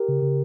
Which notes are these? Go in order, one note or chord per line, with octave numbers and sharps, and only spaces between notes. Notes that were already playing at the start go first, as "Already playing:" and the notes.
Already playing: G4 A#4
C#3
C#3